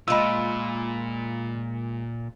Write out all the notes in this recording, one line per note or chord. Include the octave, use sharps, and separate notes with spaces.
A#2 G#3 F4 B5 E6